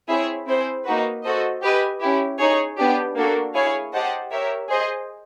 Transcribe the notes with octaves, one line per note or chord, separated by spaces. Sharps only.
C4 E4 G#4 C#5 E5
C4 E4 G#4 C5
A#3 D#4 F#4 B4
F#4 A4 C5 D#5
G4 B4 D#5 G#5
C#4 E4 G4
D#4 G#4 C#5
B3 D4 G4
A#3 D4 F#4 A4
E4 G#4 C#5 F5 G#5
G4 C5 D#5 F#5 A5
G4 A#4 C#5 E5
G#4 C5 D#5